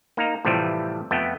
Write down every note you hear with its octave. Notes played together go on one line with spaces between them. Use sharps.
A#3 D#4 F5 A#5
A2 C3 E3 F3 G3 A3
F2 A3 B3 G5